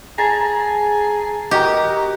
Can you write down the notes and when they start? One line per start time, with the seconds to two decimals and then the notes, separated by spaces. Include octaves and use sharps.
0.18 G#4 A5 A#5
1.51 F#4 G4 A#4 D#5